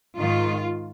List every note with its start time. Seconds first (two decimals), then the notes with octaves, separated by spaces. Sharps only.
0.17 G#2 D#3 F4